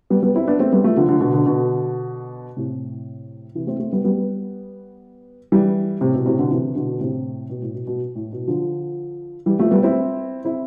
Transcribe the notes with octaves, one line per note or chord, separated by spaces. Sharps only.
G3 B3
G3 B3
C4 E4
B3 D4
A3 C4
G3 B3
F3 A3
D3 F3
D3 F3
B2 D3
B2 D3
B2 D3
A2 C3
C3 E3
A3 C4
A3 C4
G3 B3
G3 B3
E3 G3
A2 C3
B2
A2 C3
B2 D3
C3 E3
B2 D3
A2 C3
B2
A2
B2
B2
A2
B2
D3 F3
E3 G3
F3 A3
G3 B3
C4 E4
C4 E4